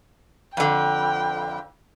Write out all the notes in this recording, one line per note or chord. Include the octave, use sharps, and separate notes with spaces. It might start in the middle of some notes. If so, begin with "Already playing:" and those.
F2 D3 G5